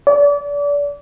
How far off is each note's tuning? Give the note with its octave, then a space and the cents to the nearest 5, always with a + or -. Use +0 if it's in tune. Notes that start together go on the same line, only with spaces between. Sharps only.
D5 -30